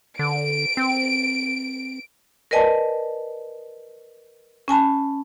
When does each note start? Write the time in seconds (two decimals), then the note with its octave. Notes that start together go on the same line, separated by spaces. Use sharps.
0.19 D3 D7
0.77 C4
2.51 A#4 B4 D5 D#5 G#5 A5
4.68 C#4 G#5 A5 B5